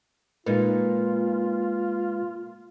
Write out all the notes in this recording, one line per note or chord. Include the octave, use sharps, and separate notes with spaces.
A#2 G#3 A#3 D#4 F4 B4